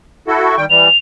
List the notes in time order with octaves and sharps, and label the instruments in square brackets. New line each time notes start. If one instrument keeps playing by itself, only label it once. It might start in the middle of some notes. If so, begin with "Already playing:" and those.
[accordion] E4 F#4 A4
[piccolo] C#6
[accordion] D#3 G3 G5
[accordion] E3 G3 [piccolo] F7